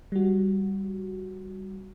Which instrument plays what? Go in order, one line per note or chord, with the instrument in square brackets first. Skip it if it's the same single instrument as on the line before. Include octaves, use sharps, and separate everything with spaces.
[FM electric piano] G3 F#4